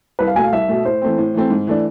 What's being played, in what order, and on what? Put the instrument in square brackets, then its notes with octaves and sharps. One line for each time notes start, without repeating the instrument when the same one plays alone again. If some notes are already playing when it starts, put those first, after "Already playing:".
[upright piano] C2 [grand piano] B4
[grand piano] F5
[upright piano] B2 A3 [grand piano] G#5
[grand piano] F5
[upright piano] C2 [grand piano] E5
[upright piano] B2 A3
[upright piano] A2 [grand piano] C5
[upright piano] E3 A3 C4
A2
E3 A3 C4
G#2
E3 A3 D4